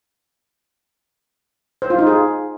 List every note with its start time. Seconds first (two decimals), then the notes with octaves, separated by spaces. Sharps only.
1.82 C5
1.90 F4
1.99 D#4
2.07 G#4